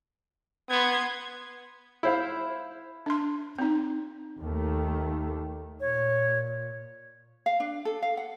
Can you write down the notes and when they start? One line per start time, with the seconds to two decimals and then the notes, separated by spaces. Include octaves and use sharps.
0.70 B3 C6 D#6 G#6
2.03 E4 C5 F5
3.06 D4 C6
3.59 C4 D#4
4.40 D#2 D#3 A3
5.80 A#2 C#5
7.46 F5
7.60 D4
7.85 A4
8.02 F5
8.17 F#5